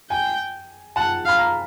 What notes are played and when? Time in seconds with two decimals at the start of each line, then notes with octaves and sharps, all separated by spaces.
0.10 G5 G#5
0.96 F#5 A5
1.25 F5 B5
1.39 A#5